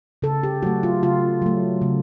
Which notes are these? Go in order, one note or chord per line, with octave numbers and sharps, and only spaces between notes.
C#3 A4
G4
F#3 A3 F#4
F4
C#3 F4
F#3 A3
C#3